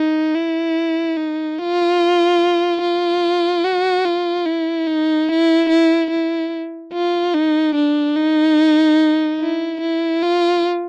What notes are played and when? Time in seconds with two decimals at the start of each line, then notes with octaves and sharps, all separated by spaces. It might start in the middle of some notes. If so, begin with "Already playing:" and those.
Already playing: D#4
0.35 E4
1.17 D#4
1.58 F4
2.82 F4
3.64 F#4
4.05 F4
4.46 E4
4.87 D#4
5.28 E4
5.69 E4
6.11 E4
6.93 F4
7.34 D#4
7.75 D4
8.16 D#4
9.40 E4
9.81 E4
10.23 F4